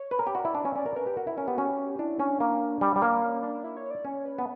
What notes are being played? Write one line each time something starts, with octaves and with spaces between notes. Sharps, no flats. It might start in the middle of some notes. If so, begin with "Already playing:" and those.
Already playing: C#5
B4
A#4
G4
F#4 D5
E4
D4
C#4
C#4 D5
A#4
A#4 B4
G4
F#4 A#4
E4
C#4 A#4
B3 G4
C#4 F#4
G4
D4 E4
C#4 D4
A#3
G3
G3
A#3
C#4
D4
E4
C#5
D5
C#4 C#5
B4
B3